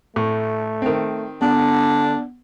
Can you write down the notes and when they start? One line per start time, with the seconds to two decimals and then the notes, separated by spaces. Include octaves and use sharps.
0.16 A2 A3
0.82 D#3 C4
1.42 D3 B3 D4